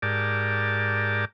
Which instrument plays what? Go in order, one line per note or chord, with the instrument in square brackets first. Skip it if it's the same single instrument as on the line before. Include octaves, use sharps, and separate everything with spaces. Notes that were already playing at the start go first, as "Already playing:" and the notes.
[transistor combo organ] G#2 G4 A#4 D5 A5